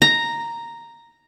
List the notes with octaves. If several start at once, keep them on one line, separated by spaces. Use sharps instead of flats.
A#5